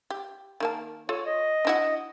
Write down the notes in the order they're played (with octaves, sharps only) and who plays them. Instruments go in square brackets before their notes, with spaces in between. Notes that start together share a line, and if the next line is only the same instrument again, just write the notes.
[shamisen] G4
D#3 A#3 A5
[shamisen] F4 A4 [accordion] C#5
[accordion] D#5
[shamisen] D4 E4 F#4